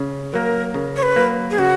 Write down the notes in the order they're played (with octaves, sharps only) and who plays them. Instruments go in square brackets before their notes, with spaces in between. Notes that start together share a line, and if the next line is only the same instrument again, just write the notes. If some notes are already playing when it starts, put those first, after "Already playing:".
Already playing: [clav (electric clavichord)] C#3
[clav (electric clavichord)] F#3 A#3 [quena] A#4
[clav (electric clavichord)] C#3
[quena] C#5
B4
[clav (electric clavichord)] F#3 A#3
[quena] G#4
[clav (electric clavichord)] C#3 [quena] F#4